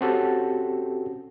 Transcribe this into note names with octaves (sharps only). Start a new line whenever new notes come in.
C4 C#4 F#4 G4 A4